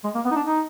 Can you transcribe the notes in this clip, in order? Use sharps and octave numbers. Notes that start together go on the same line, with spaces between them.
G#3
A#3
B3
D#4
D4
D#4